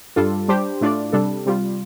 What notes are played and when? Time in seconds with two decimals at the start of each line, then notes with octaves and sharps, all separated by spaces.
0.16 G2 G3 D4 F4 A4
0.48 G3 D4 G4 C5
0.81 A2 A3 D4 F4 D5
1.12 C3 G3 D4 A4
1.46 C3 G3 F4